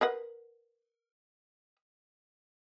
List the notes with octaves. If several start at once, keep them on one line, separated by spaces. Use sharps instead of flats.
A#4 B4 F#5